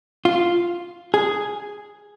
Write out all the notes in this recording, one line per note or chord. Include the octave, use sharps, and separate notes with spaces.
F4
G#4